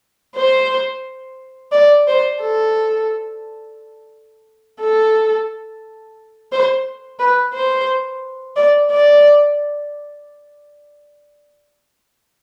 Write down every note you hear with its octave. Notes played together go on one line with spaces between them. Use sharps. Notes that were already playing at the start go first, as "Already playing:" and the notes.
C5
D5
C5
A4
A4
C5
B4
C5
D5
D5